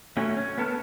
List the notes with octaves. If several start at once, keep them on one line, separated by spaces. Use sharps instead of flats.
A3 C#4 F#4
C#4
B3 A4 A#4 F6